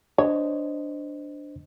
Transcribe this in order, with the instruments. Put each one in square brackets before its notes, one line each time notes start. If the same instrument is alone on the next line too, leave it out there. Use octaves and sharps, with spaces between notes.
[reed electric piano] D4 C5 D#5 [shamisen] C#5